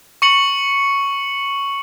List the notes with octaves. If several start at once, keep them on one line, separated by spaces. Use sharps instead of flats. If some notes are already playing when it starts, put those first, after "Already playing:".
C#6 C#7 F#7